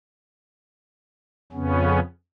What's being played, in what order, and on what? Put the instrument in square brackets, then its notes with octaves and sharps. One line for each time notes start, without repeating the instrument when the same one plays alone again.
[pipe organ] F2 C#3 B3 C#4